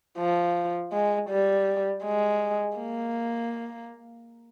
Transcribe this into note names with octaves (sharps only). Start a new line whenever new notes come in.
F3
G#3
G3
G#3
A#3